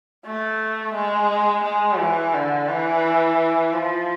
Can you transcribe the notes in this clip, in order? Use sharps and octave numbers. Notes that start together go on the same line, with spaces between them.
A3
G#3
G#3
E3
D3
E3
F3